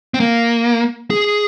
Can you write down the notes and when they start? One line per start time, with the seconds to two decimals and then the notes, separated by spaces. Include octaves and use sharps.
0.14 C4
0.20 A#3
1.10 G#4